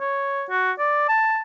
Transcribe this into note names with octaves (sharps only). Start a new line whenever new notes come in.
C#5
F#4
D5
A5